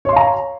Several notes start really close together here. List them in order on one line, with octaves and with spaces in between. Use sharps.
C#5 C6 F5 A#5